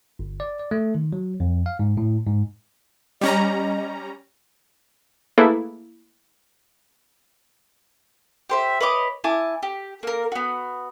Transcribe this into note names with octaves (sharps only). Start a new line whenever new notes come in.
G1
D5
D5
A3
D#3
F#3
F2
F5
G#2
A2
G#2
G3 C#4 D#5 A#5
A3 A#3 E4 G#4 A4 B4
G4 C5 E5
B4 C#5 D#5 D6
E4 G#5 A5 D6
G4
A#3 A#4
B3 F#4